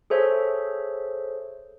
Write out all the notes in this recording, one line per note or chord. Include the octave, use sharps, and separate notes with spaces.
G#4 A4 C5 C#5 E5